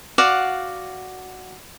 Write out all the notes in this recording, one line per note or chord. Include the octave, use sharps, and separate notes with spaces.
F#4 D5 F5 F#5